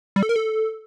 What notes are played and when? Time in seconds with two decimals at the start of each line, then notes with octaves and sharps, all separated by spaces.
0.16 G3
0.23 A4
0.29 A#4
0.36 A4